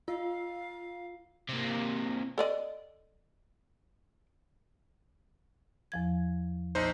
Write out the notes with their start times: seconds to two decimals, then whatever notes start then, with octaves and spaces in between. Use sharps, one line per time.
0.08 F4 F5
1.49 C3 A#3
2.38 A4 D5 D#5
5.92 E2 F3 G#6
6.75 A#1 D#4 C5